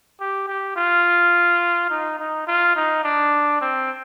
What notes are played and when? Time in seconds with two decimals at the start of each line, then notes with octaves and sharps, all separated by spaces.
0.20 G4
0.48 G4
0.76 F4
1.90 D#4
2.19 D#4
2.47 F4
2.76 D#4
3.04 D4
3.61 C4